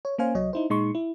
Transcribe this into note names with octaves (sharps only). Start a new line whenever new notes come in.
C#5
A#3 C#4 C5 F5 G#5
C2 F#3 C#5 D#5
D#4 E4 C5
A#2 G#3 D#4 C6 C#6
E4